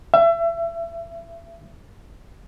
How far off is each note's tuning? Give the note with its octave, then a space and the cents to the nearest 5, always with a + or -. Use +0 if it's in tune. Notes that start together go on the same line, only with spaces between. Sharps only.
E5 +30